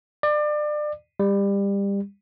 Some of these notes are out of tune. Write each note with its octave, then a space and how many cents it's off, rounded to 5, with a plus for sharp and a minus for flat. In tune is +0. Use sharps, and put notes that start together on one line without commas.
D5 +30
G3 +25